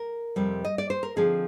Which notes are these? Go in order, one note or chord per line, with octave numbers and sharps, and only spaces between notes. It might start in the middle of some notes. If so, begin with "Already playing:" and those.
Already playing: A#4
F2 C3 G3
D#5
D5
C5
A#4
D3 F3 C4 D#4 G#4